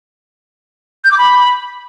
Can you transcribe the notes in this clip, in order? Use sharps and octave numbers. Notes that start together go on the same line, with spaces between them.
G6
D6
B5